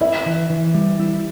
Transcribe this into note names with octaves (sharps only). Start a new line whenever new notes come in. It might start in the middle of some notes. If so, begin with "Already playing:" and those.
E4 E5
E3
E3
G3
E4